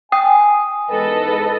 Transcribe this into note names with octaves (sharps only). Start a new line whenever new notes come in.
G5 G#5 D#6
E2 G#2 A4 B4 D#5